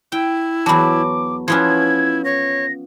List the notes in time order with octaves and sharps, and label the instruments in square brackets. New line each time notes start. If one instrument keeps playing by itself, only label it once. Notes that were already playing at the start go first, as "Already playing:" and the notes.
[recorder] E4 [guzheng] G5
[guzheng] E2 F#3 [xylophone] A5 B5 [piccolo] D6
[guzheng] F3 B3 C#4 [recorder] E4 [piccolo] G#6
[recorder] C#5 [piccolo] A#6